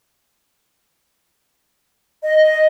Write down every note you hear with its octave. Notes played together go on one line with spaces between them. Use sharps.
D#5